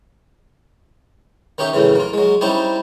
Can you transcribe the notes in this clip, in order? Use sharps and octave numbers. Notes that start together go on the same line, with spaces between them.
D#3 C#4 D#4 G4 E5
F#2 A2 C#3 E3
A#3 F4
F#3 G#3
G3 C4 C#4 D#4 E4 G4